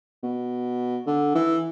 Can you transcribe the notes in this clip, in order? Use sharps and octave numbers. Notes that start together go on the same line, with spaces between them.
B2
D3
E3